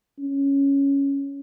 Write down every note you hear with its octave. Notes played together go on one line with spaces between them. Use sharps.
C#4